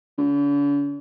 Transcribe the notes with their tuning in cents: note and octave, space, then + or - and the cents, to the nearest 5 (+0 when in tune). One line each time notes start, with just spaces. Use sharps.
D3 -45